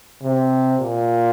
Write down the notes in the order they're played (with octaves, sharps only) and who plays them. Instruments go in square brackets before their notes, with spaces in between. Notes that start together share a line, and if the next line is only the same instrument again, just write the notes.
[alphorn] C3
A#2